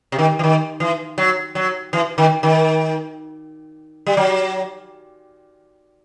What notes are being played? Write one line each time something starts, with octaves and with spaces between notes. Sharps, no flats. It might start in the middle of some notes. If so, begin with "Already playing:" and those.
C3
D#3
E3
D#3
E3
F#3
F#3
E3
D#3
D#3
G3
F#3